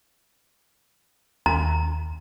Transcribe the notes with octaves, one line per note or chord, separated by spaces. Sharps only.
D#2 A#5